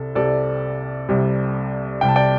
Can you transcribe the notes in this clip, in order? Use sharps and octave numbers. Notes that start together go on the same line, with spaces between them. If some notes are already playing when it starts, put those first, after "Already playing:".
Already playing: C2 C3 G3 A4
C2 C3 G3 A4 D5
C2 C3 G3
C2 C3 G3 G5
A5
D5 G5